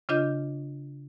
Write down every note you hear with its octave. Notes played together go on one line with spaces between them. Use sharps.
C#3 D4 F4 D#5 G6